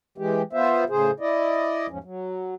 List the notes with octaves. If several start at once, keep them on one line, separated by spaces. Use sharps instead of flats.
E3 G#3 G4
B3 F4 C5 E5
A2 C#3 G#4 C5
E4 D5 D#5
E2 G#2 F3 C#4
F#3